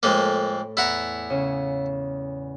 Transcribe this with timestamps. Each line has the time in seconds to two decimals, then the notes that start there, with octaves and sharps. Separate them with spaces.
0.03 F2 A2 G#3 A#3 A4
0.77 E2 E4 F#5 A#5
1.30 C#3